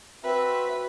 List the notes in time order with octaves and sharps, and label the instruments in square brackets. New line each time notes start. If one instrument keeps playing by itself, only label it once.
[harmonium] C4 E5 [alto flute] F#4 [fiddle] B4